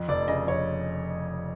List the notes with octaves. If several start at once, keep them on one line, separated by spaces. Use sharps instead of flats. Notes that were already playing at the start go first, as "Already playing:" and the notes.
Already playing: F2
F1 D5
C#3 D#5
F1 C#5